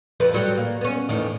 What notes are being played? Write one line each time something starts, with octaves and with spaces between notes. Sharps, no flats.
F2 F3 B4
A2 F#3 G3
A#3
B3 C#4
E2 A2 D#3